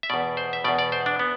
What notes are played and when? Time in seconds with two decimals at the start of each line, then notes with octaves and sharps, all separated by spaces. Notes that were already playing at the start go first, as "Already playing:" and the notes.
0.03 E5
0.10 E2 B2 D5
0.37 C5
0.53 E5
0.64 E2 B2 D5
0.79 D5
0.92 C5
1.06 D4
1.19 B3